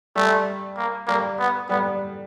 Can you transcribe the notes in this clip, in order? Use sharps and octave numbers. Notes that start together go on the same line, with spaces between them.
G3 A3
A#3
G3 A#3
B3
G3 B3